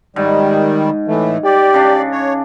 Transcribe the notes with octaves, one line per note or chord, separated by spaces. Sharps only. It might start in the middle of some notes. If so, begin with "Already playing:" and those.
G#2 D#3 G3
A2 E3 A3
G4 D5
C#3 D4
C#5